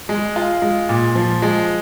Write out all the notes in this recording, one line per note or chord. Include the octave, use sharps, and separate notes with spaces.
G#3
F4
G#3
A#2
F3
G#3